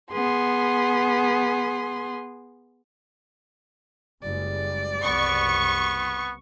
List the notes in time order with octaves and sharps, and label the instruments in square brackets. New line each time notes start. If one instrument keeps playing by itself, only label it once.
[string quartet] B3 G#4 C6
[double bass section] F#1 G3 G#3 [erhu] D5
[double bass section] F#1 C2 [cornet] B3 [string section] C#6